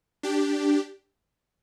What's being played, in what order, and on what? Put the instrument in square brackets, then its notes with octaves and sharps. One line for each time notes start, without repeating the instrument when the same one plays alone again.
[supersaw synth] D4 G4